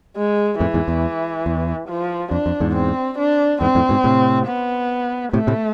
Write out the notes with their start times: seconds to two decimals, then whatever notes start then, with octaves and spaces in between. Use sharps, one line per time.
0.16 G#3
0.60 F2 A2 E3
0.74 E2 G#2
0.88 E2
1.46 E2
1.88 F3
2.31 F2 D4
2.46 F2
2.61 E2 G#2
2.76 C4
3.18 D4
3.61 E2 G#2 C4
3.75 F2 A2
3.89 G#2 B2
4.04 A2 C3
4.47 B3
5.33 A2 C3 A3
5.47 A2 C3